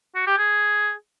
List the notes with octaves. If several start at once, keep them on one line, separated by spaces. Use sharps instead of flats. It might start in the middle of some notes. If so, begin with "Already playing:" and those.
F#4
G4
G#4